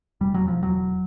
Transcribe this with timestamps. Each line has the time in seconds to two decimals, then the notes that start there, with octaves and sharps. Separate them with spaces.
0.21 E1 G3
0.34 F#3
0.44 E1 F3
0.63 F#3
0.68 E1